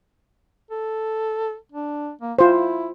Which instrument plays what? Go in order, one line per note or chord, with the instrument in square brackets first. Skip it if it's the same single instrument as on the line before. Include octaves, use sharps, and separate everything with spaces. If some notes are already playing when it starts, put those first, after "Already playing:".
[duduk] A4
D4
A#3
[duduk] E4 [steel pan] F4 C5